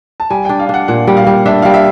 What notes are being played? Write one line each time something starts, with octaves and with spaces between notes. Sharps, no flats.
A5
G3 G#5
D4 G5
F5
D4 F#5
A#2 F#5
G3
F5
G3
D4 E5
G3 F5
E5